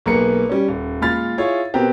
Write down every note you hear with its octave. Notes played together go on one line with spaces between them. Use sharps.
B1 A#3 G#4 A#4 B4 C#7
G3 C#4
D#1
A#2 G#3 F4 B5 F6 A6
E4 F4 G#4 C#5
B2 C4 G4 A#4 B4